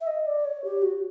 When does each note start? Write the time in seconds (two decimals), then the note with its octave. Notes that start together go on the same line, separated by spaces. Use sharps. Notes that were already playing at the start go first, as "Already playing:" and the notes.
0.01 E5
0.07 D#5
0.27 D5
0.45 C#5
0.64 G4
0.82 F#4